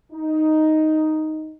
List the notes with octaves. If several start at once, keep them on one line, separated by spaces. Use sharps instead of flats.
D#4